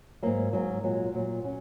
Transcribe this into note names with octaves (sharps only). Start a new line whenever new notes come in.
G#2 F#3 A#3
G#2 F#3
A#2 F#3 G#3
A#2 F#3
F#3 C#4